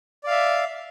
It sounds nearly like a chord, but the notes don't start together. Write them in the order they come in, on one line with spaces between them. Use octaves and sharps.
D5 F5 E5